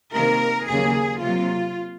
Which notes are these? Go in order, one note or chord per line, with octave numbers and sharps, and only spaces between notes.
C3 D#3 A#3 A#4
D#2 C#3 F#3 A#3 G#4
C3 F#3 A#3 F4